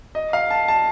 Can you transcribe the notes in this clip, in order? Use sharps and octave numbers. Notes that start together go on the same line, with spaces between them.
D#5
F5
A5
A5